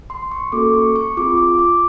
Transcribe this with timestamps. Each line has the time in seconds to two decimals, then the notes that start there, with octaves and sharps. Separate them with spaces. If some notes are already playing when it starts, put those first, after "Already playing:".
0.10 C6
0.31 C#6
0.52 A#3 C#4 F#4 A4 D6
0.74 C#6
0.96 C#6
1.17 C4 F4 G#4 D6
1.37 D6
1.59 D6